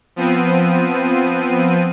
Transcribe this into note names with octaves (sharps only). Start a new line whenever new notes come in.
F3 B3 C4 D#7